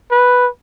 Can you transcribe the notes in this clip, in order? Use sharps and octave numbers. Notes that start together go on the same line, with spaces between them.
B4